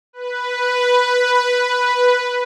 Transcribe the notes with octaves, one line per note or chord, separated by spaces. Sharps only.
B4